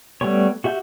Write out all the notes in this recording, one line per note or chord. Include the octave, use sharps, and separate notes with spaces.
G3 A3 B3 G4 C#5
F#4 G4 E5 G6